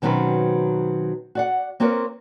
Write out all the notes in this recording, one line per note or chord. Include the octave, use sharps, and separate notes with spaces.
B2 D#3 F#3 C4 C#4 B4
F#4 D5 F#5
A#3 C4 F4 A#4 B4 C#5